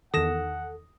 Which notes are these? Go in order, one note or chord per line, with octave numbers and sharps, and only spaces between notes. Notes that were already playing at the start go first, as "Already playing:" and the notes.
E2 D#3 A4 F#5 D#6 A#6 E7